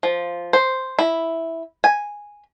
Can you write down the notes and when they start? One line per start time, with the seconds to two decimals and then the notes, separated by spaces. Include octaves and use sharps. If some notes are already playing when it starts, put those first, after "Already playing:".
0.03 F3
0.53 C5
0.99 E4
1.84 G#5